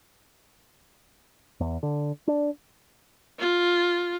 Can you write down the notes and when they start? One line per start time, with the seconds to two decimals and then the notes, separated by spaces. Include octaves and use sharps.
1.60 E2
1.83 D3
2.27 D4
3.39 F4